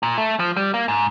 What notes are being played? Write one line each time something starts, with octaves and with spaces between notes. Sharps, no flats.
A#2
A3
F3
G3
A#3
G#2